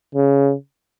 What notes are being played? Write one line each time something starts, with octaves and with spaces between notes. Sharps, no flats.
C#3